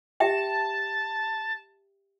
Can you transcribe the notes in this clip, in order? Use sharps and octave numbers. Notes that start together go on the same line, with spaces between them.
G4 E5 G5 A5